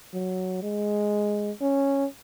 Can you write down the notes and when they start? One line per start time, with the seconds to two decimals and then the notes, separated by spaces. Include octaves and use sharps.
0.14 F#3
0.63 G#3
1.61 C#4